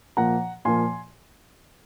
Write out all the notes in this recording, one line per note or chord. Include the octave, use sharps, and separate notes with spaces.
A#2 F3 A#3 F#5 A#5
A#2 F3 A#3 G#5 C6